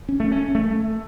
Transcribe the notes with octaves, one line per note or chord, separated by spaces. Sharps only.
C#4
A3
C#4
A3